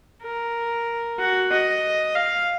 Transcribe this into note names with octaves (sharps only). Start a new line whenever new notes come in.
A#4
F#4
D#5
F5